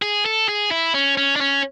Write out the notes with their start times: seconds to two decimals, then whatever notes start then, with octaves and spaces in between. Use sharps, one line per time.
0.02 G#4
0.26 A4
0.49 G#4
0.71 E4
0.94 C#4
1.17 C#4
1.36 D4
1.41 C#4